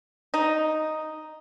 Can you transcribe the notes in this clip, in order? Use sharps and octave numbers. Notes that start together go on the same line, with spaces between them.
D#4